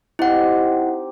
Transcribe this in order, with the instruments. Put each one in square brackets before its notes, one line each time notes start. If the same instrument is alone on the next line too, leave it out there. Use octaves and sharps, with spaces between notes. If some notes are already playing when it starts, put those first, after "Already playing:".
[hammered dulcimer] C4 D#4 G4 [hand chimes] E4 F#5